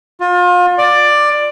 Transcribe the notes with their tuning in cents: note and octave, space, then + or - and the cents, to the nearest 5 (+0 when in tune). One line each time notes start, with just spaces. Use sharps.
F4 +35
D5 +10